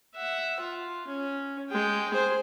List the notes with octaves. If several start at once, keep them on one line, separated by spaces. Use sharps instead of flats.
E5 F#5
F4
C#4
G#3 G5
G#4 C5